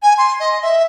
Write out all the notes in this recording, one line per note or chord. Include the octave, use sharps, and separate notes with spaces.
G#5
C6
D#5
E5